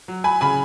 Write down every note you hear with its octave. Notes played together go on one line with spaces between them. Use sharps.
F#3
G#5 B5
C#3 G#5 B5